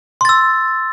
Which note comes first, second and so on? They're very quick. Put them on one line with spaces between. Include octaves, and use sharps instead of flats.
C6 A6 E6